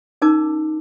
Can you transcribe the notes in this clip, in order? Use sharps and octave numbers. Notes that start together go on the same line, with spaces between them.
C#4 D#4 A#4 A5 D6